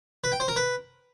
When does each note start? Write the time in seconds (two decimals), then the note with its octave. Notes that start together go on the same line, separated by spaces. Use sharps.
0.24 B4
0.32 G5
0.40 C5
0.48 A#4
0.56 B4